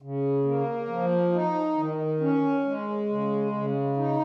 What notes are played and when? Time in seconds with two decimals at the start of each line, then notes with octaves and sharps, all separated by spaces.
0.02 C#3
0.45 A#3
0.88 F3
1.33 D#4
1.77 D#3
2.20 C#4
2.64 G#3
3.09 C#3
3.52 C#3
3.97 D#4